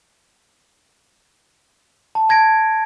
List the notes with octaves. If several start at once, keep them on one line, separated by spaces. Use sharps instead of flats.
A5
A5 G#6 A#6 D7